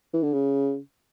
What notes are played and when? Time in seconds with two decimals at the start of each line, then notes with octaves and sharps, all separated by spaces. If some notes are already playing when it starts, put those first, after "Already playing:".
0.13 E3
0.23 D3
0.33 C#3